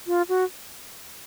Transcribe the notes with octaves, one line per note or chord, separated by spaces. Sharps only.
F4
F#4